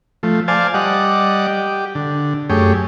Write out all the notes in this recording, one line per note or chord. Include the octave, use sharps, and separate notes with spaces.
F3 A3
C5 D5 F5 G#5 A5
G3 D5 D#5 F#5
G4
D3
F#2 A3 G4 G#4 C#5